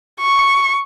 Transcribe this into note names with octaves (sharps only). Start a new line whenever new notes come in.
C#6